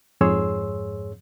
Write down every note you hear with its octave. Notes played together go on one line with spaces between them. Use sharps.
F2 G#2 G#4 C#5 C6 E6